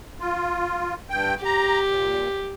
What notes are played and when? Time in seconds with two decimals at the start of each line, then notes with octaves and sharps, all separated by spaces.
0.20 F4
1.10 G2 G5
1.45 G4 A#5
1.87 A#2